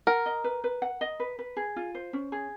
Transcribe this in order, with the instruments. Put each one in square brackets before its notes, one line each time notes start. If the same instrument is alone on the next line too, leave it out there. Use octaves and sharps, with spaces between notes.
[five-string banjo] A#4 [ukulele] F#5
[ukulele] D#5
B4
B4
F#5
D#5
B4
B4
G#4
F4
C5
C#4
G#4